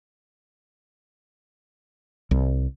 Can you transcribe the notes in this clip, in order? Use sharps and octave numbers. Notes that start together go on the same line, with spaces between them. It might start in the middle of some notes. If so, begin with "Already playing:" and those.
C2